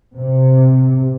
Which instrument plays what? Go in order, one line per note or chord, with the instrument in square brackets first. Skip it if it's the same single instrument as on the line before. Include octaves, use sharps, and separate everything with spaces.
[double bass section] C3